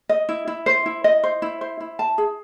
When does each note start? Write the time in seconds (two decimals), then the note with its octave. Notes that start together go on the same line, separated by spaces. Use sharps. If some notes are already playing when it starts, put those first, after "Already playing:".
0.09 D#5
0.29 E4
0.47 E4
0.66 C5
0.86 E4
1.04 D#5
1.24 C5
1.42 E4
1.61 C5
1.80 E4
1.99 A5
2.18 G#4